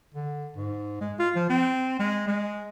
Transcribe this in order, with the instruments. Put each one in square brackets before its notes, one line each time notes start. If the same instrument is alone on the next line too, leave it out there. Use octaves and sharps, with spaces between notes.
[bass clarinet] D3
G#2
G#3
F4
F3
C4
G#3
G#3